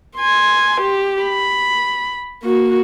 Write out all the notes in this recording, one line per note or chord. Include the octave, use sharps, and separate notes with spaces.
G#5 C6
G4
B5
A#3 F#4